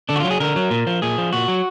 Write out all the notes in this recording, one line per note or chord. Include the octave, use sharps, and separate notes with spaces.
D3 D4
F#4
F#3 F4
G#4
D3 A#4
F#3
A#2
F3
A#2 G#4
F3
A#2 F#4
F#3